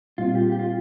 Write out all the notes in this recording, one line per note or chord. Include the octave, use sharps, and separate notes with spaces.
A#2 G3 C4 F4
G4
G4
F4